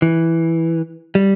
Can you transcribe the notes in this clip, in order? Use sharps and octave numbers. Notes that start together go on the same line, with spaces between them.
E3
G3